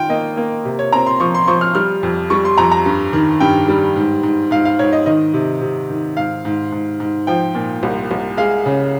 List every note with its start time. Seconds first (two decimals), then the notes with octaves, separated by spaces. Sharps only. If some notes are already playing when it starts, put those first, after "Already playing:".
Already playing: D#3 F4 G5
0.09 A#3 D#5
0.37 A#3
0.65 C3
0.79 C#5
0.92 C4 A#5
1.06 C6
1.20 F3 C#6
1.34 C6
1.47 F3 C#6
1.61 F6
1.75 G3 F6
2.03 F2
2.30 G3 C#6
2.45 C6
2.58 F2 A#5
2.72 A#5
2.86 G2
3.13 D#3
3.40 G2 G5
3.68 G3
3.96 G#2
4.23 G#2
4.51 G#2 F5
4.65 F5
4.79 G#2 C#5
4.93 D#5
5.06 D#3 D#5
5.34 C3
5.61 C3
5.90 D#3
6.17 G#2 F5
6.45 G#2
6.72 G#2
7.00 G#2
7.27 F3 G5
7.55 A#2
7.83 C2
8.11 C2
8.37 G#3 F5
8.66 C#3